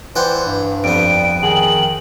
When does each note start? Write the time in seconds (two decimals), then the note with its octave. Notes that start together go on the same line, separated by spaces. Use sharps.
0.16 E3 C5 D5 F#5 G5
0.46 G2
0.84 F2 G3 B3 D7
1.43 D#3 G#4 F#7